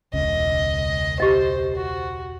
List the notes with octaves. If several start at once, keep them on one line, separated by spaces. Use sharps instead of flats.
E1 C#2 C#3 D#5
G4 C5 D#5
F#4